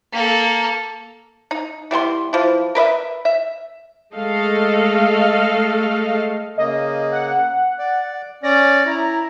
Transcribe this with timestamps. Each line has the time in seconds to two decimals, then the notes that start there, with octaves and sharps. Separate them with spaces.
0.13 A#3 A4
1.51 D#4
1.91 E3 G3 B3 C6
2.33 E3 F3
2.75 A#4 B4 D#5 E5
3.25 E5
4.15 G#3 A3 A4 D#5 F5
6.58 C#3 A#3 D#5
7.12 F#5
7.79 D5
8.43 C#4 D5 A#6
8.86 E4 A#5